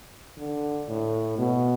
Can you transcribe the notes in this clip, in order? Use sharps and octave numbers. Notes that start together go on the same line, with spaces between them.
D3
A2
B2